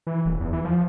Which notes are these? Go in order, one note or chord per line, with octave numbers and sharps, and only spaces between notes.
E3
D#1
E2
E3
F3